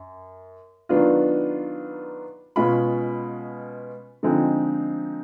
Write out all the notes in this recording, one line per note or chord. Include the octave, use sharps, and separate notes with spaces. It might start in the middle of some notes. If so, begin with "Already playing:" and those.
Already playing: F#2
D#3 F#3 B3 D4 F4
B2 G#3 C#4 F4 B5
D3 F3 G#3 C4 D#4